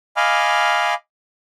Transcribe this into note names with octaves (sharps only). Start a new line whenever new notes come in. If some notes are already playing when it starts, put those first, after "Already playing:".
D#5 F5 G#5 B5 D6 F6